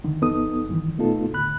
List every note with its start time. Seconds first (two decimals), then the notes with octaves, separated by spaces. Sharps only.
0.04 C#2 D3 D#3
0.22 F2 B3 D#4 A4 D#6
0.69 G2 D#3 E3
0.97 B2 A3 B3 D#4 F4 A4
1.33 D#2 A2 D3 B5 F#6